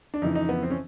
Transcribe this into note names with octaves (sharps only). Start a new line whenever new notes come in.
D4
F2 C#3 E3 D#4
D#4
B3
C4
C#4